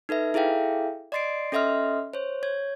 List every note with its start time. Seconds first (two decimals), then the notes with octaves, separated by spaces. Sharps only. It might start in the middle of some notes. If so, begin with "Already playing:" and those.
0.09 D#4 A4 B4 E5
0.34 E4 G#4 A4 E5 F5 G5
1.12 D5 D#5 C6 A6 C7 D7
1.52 C#4 A4 D#5 E5 C6 F6
2.14 C5 C#5
2.43 C#5 G#6